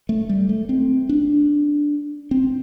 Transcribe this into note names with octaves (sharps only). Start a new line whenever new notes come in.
A3
G3
A3
C4
D4
C4